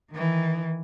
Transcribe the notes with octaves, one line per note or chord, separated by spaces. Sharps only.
D#3 E3